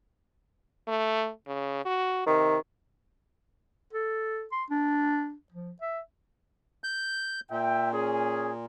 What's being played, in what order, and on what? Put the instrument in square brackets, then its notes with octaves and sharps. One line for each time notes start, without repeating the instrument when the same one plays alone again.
[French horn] A3
C#3
F#4
[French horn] C3 [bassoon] D#3
[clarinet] A4
C6
D4
F3
E5
[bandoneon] G6
[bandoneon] A#2 [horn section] E5 G5
[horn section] C#4 G#4